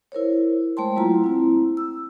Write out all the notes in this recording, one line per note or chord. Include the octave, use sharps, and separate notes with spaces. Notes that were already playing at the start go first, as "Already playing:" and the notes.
E4 A#4 C5 C#5
G#3 A3 C5 G5 A5 C6
F#3 A#3 E4 F4 A#5
C4 E4
E6